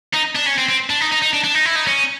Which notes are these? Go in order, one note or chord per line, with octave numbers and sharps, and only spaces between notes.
D#4
D4
C#4
C4
C4
D4
D#4
D#4
D#4
D4
D4
D#4
E4
D#4
C#4